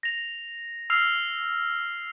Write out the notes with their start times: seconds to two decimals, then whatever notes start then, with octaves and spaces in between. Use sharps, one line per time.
0.03 A#6 F7
0.90 E6 F6 C7 F7